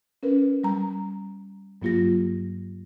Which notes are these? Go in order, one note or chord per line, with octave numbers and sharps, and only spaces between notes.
C#4 A#4 B4
G3 A#5
G2 F#3 A#3 F4 G4 A#6